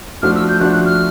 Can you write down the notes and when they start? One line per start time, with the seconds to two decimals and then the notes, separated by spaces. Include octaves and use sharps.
0.22 F3 A3 D4 F#4 F6
0.36 E6
0.48 G6
0.60 F3 A3 D4 F#4 F#6
0.73 F#6
0.86 F6